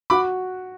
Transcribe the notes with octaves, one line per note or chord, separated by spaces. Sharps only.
F#4 B5 D6